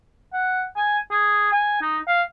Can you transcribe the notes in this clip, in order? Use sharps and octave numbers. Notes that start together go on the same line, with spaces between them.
F#5
G#5
G#4
G#5
D#4
F5